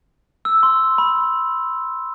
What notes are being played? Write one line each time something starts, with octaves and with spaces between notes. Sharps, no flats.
E6
C6
B5